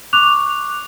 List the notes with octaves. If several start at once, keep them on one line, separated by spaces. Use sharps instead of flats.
C#6 D6 F#6 F7